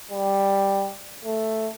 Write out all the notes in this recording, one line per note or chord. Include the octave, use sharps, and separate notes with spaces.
G3
A3